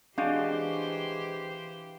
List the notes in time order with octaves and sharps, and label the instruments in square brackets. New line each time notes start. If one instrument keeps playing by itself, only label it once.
[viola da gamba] E3 G4 C5 [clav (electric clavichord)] G#3 F#4 G5 [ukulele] D4 [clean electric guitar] F5